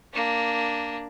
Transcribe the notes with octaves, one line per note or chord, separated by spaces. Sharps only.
A#3 D4